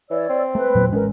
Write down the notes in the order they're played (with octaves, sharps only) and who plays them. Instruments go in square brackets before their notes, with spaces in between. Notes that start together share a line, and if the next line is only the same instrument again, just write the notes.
[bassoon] E3 [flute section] C#5 D5 E6
[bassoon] C4
[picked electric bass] A3 [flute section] B4
[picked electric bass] E1 A#2 F#3
[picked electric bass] A1 G#3 C#4 [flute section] A#4 B4